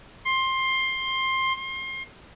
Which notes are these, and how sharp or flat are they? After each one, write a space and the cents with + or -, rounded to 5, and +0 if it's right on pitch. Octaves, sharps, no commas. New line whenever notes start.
C6 +15
C6 +30